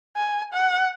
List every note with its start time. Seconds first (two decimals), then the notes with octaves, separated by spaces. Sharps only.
0.17 G#5
0.53 F#5